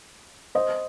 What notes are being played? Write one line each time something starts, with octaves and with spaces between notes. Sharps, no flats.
C5 D#5